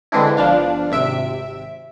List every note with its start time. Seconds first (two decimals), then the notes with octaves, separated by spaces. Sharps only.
0.12 D3 E3 G#3 C4 D4 E4
0.37 G1 F3 D4 F5
0.90 G#1 C3 E5 D7